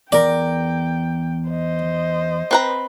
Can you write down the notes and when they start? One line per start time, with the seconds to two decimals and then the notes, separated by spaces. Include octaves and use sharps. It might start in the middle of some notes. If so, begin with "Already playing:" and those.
0.12 E2 A#4 D5 G5
1.49 C5 D#5
2.51 C4 B4 A#5